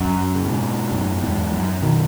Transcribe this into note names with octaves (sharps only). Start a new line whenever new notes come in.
F#2
C#3
G#2 B2
F#2 A2
E2 G#2
F#2
B2 D#3